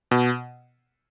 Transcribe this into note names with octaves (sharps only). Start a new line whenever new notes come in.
B2